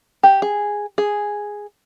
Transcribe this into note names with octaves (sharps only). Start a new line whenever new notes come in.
G4
G#4
G#4